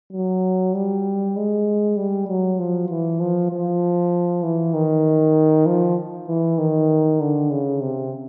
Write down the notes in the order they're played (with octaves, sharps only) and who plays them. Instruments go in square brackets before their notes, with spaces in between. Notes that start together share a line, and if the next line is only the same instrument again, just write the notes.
[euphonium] F#3
G3
G#3
G3
F#3
F3
E3
F3
F3
E3
D#3
F3
E3
D#3
D3
C#3
C3